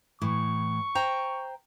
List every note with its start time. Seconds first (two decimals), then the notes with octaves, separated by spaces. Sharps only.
0.22 A2 E3 C#6
0.95 C5 G5 A#5